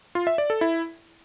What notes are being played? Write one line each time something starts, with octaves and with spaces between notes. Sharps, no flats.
F4
E5
D5
A4
E4